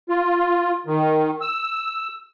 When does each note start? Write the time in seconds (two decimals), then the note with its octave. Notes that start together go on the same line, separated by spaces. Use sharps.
0.09 F4
0.86 D#3
1.41 E6